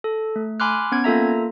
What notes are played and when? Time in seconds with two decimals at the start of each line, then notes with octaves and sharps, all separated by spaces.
0.04 A4
0.36 A3
0.60 G#5 B5 C6 D6 F6 F#6
0.92 B3 C#4 G#6
1.04 A#3 F4 A4 E5 A#5